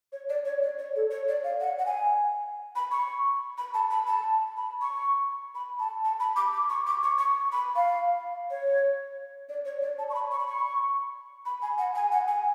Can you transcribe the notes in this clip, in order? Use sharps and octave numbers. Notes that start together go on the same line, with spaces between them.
C#5
D5
C#5
D5
C#5
A4
C#5
D5
F5
F#5
F#5
G#5
B5
C#6
B5
A5
B5
A5
B5
C#6
B5
A5
A5
B5
D6
D6
C#6
D6
C#6
C#6
B5
F5
C#5
D5
C#5
D5
A5
C#6
B5
C#6
B5
C#6
B5
G#5
F#5
G#5
F#5
G#5